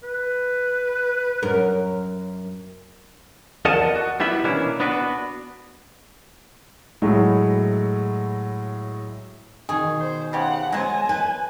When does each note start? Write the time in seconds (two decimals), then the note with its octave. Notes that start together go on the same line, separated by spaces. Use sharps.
0.03 B4
1.43 F#2 A#4
3.65 E2 A#4 D5 D#5 F#5 A5
3.95 F#4
4.20 G3 B3 E4 E5
4.44 B2 E3 A#3 C#4 D4 E4
4.80 B3 D4 F#4 B4
7.02 A2 F#3 G#3 E4
9.69 B2 D#3 G#4
10.00 C5
10.33 C#3 G4 C5 F#5
10.72 F#3 G#3 B3 C5 G#5 A5
11.09 B4